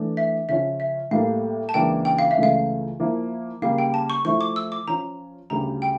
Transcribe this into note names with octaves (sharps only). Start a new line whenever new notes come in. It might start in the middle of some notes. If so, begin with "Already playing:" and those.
Already playing: E3 A3 D4
E5
C#3 F3 C#4 F4 E5
E5
A2 G3 A#3 E4 A4 F5
A5
C#2 C#3 E3 A#3 D4 G5
G5
F5
E5
C#2 C#3 E3 A3
F5
F3 A#3 E4
C#3 G3 A#3 F5
G5
A5
C#6
F3 A3 E4 C#6
D6
E6
D6
F3 C#4 F4 A#5
D2 C#3 G3 A#5
G5